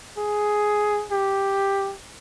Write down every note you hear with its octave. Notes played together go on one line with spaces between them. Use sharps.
G#4
G4